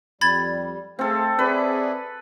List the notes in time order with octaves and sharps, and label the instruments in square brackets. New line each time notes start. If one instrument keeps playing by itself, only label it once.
[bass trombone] F2 [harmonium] G3 [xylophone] B5 G#6 A6
[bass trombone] A3 [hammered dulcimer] C4 A4 [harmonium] G#4 F5
[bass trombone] C4 [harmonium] G#4 D5 E5 [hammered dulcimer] B4